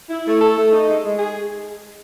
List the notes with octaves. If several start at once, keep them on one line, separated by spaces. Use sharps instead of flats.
E4
A3
A4
A3
D#4
G#3
G#3
G#4